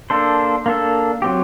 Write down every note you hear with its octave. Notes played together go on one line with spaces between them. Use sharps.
A#3 D4 A4 C5
A#3 D4 A4
F#3 C4 G4